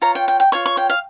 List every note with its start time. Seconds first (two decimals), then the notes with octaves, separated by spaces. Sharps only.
0.02 F4 C#5 A#5
0.15 G5
0.28 G5
0.40 G5
0.52 F4 C#5 C#6
0.66 C#6
0.77 G5
0.90 F5